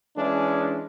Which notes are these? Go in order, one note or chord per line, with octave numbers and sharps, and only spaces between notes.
E3 G#3 C#4 D4